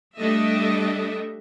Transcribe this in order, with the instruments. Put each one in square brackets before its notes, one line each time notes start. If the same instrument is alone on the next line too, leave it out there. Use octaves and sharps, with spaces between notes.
[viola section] G3 A3 D4 A4 D#5 E5